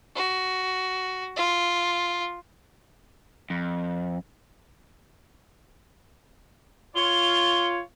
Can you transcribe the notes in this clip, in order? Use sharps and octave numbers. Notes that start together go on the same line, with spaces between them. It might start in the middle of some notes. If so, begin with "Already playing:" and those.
F#4
F4
F2
F4 C#5 G7